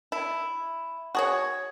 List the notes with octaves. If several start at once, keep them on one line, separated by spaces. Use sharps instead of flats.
E4
F#4 G#4 C#5